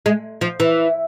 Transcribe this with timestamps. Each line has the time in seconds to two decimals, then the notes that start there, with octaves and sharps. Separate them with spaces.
0.06 G#3
0.41 F3
0.60 E3